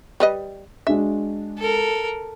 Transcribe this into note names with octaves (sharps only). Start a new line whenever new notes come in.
G3 B4 D#5
G#3 D4 F#4 E5
A4 A#4